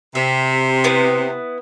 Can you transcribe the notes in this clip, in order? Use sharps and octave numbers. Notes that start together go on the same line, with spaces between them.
C3 E5
B3 E4 B4